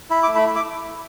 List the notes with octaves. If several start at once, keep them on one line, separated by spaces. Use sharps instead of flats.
E4 B5
D6
A3
B5
E4
D6